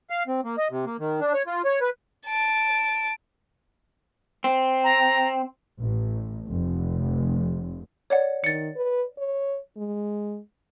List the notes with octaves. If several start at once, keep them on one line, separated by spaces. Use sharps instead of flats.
F5
C4
A#3
D#5
C3
A#3
D#3
D4
C#5
F4
C#5
B4
A5 D7
C4
A#5
A1
F1
C#5 D5 F#5
D#3 A6 C#7
B4
C#5
G#3